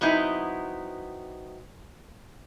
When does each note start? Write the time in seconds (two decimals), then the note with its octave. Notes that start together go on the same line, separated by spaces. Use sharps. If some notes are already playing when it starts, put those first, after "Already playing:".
0.01 F#3 B3 C4 D#4 E4